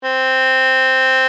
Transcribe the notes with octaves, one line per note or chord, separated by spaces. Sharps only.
C4